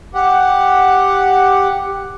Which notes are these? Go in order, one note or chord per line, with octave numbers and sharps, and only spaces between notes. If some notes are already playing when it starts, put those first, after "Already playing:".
G4 F#5